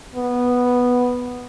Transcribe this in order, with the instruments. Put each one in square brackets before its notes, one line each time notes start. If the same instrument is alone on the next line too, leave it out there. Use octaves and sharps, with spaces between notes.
[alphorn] B3